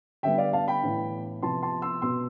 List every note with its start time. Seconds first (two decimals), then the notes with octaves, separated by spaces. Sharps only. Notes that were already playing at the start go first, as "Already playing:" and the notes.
0.23 D3 G3 B3 E5 G5
0.38 D5 F5
0.53 F5 A5
0.68 G5 B5
0.83 A2 E3 B3
1.42 C3 F3 B3 A5 C6
1.63 A5 C6
1.82 C6 E6
2.02 B2 B3 C6 E6